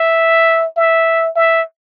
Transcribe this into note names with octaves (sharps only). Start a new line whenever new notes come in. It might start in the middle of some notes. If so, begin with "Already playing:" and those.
Already playing: E5
E5
E5